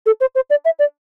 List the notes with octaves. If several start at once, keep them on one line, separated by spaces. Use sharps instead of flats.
A4
C5
C5
D5
E5
D5